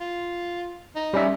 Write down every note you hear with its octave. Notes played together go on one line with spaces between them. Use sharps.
F4
D#4
G3 C#4 E5